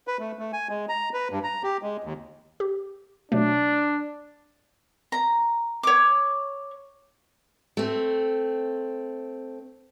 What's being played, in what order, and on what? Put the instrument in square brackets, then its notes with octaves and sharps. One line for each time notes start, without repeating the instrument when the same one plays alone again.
[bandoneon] B4
A3
A3
G#5
G#3
A#5
B4
G2
A#5
G4
G#3
D#2
[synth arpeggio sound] G4
[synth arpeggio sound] B2 F#3 A3 [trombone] D4
[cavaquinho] A#5
C#5 D6
[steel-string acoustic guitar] A3 C4